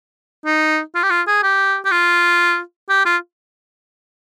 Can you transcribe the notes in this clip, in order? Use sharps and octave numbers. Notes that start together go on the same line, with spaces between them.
D#4
F4
G4
F4
G#4
G4
G4
F4
G4
F4